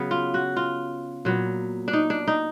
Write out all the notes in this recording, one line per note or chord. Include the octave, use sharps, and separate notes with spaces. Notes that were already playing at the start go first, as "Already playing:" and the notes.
Already playing: C#3 F#3 B3
F4
F#4
F4
A#2 F#3 B3
D4
D#4
D4
D#4